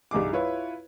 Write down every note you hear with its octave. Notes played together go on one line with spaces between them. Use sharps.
C2 G2 D#4 G#4 D6
E4 F4 B4 C#5